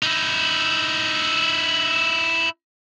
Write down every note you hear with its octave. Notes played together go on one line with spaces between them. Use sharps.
D#4 E4